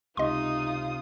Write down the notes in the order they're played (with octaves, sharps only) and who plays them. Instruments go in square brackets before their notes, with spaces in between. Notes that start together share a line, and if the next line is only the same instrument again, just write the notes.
[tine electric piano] C#2 C3 [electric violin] D#4 [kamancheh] F4 D#6 [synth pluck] D#5 C6